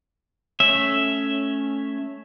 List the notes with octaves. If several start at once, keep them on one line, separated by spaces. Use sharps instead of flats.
A3 C#4 E5